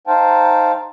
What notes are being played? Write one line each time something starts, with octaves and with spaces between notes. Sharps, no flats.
D#4 C5 F5 G5 A5